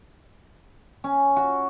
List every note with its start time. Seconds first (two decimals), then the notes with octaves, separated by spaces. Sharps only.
1.04 C#4
1.36 F#4